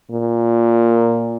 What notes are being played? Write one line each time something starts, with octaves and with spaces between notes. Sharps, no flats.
A#2